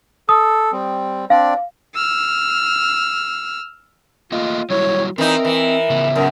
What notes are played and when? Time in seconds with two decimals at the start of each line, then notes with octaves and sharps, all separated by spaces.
0.29 A4 D#6
0.73 G3 C4
1.30 C4 D4 D5 F5
1.95 E6 F6
4.32 A3 A#3 F4 D#5
4.70 F#3 G3 E4 C#5
5.18 E3 C4 D#4 A#4
5.45 E3
5.90 C#3 B3
6.16 F#2 A#4